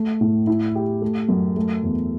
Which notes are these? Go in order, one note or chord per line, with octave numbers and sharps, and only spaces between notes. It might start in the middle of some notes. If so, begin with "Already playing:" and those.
Already playing: A3
A2
E4
G4
A3
F#2
A3
E2